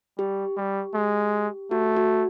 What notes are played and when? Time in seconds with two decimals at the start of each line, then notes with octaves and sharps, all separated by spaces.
0.18 G3 G4
0.57 G3
0.95 G#3
1.71 A3 F#4
1.97 F#4